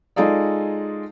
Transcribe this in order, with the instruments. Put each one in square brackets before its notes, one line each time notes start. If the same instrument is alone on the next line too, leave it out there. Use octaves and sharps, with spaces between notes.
[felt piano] G#3 D#4 F4 G#4 A4 D5